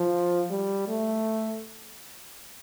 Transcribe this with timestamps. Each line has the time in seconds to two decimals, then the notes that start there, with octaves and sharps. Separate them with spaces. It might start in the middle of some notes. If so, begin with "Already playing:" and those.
Already playing: F3
0.50 G3
0.88 A3